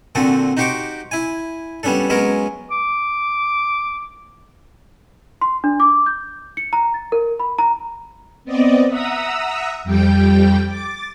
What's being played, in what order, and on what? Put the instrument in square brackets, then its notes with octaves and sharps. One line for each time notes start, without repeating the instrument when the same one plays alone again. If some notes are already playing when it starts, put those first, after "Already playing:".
[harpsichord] A#2 D3 F3 C4 F#4 A4
D#4 F#4 G4 C5 C#6 D6
E4 G#5
G3 B3 C#4 D4 A4
F#3 G#3 B3 C#4 A#4
[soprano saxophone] D6
[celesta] C6
D4
D6
G6
C#7
A#5
A6
A#4
B5
A#5
[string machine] B3 C4 D5 D#5
E5 F#5 A#5 D#6 E6
F2 G3 G4 G5 G6
D6 A6